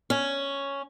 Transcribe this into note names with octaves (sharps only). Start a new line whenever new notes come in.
C#4